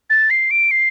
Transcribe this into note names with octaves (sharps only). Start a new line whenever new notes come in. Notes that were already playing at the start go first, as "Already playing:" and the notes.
A6
C7
D7
C7